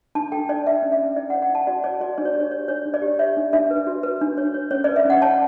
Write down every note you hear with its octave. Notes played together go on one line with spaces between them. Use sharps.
D4 A5
A4 G5
D4 D5
B4 E5
C#4
E5
C#4
E4 D5
F#5
C#5
F#5
E4 A5
F#4 D5
C#5 D5
F#4 D5
D4 D5
C#5
G4 C#5
C#5
D4 C#5
D4
D5
G4
C#5 E5
D4
D4 E5
B4
F#4
B4
D4
C#5
C#5
C#4 C#5
B4 D5
E5
C#4 F#5
C#5 A5